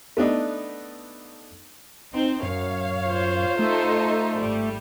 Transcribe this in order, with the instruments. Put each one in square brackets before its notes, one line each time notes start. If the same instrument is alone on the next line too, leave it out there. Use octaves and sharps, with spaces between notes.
[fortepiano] A3 B3 D4 D#4
[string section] C4 D#4
[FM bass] F#2 [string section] C#5 F5
[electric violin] F4 C5
[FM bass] A3 [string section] D#4 A4
[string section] G#1 G3